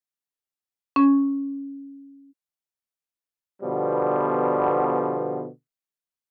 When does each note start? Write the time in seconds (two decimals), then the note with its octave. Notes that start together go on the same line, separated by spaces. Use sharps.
0.96 C#4
3.62 B2 D3 F3 G3 B3